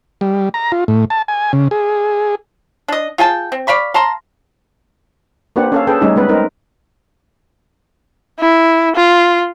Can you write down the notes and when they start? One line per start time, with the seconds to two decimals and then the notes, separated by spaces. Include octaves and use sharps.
0.21 G3
0.54 A#5
0.72 F4
0.88 A2
1.10 A5
1.28 G#5
1.53 C#3
1.71 G#4
2.88 D4 D#5
3.18 F4 G#4 G5 A5
3.52 C4
3.67 D5 F5 B5 C#6
3.94 F5 A5 A#5 C6
5.56 A#3 C4 D4 G4 B4 F#5
5.72 C#4 A4 F5
5.87 G#4 A4 B4 G5
6.01 G3 A3 C#4 D#4 G#4
6.16 G#3 B3 B4
6.29 C4 D#4 A#4
8.40 E4
8.95 F4